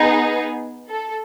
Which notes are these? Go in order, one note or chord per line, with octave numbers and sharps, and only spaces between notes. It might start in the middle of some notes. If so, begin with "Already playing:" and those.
Already playing: B3 D#4 G#4
A4